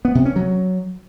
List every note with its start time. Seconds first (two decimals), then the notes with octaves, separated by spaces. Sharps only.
0.05 B3
0.15 C3
0.25 C#4
0.36 F#3